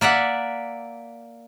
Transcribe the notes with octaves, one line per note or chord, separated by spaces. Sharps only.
A#3 D5 E5 F#5